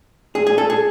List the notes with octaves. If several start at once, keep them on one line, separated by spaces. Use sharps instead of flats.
G#4
G#4
A4
G#4